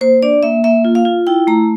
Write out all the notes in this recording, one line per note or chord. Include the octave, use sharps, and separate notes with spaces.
A#3 C5
D4 D5
A#3 E5
A#3 E5
F4
F5
F4
E4 G5
A3 A#5